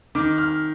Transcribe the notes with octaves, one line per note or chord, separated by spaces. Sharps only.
D#3 D6
F6